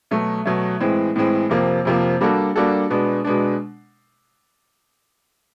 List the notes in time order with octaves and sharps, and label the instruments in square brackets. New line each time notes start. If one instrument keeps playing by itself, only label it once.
[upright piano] B2 F#3 A3
B2 F#3 A3
A2 E3 G#3 C4
A2 E3 G#3 C4
F2 C3 F3 A#3
F2 C3 F3 A#3
G3 A#3 D4 F#4 A4
G3 A#3 D4 F#4 A4
B2 G#3 B3 D4
B2 G#3 B3 D4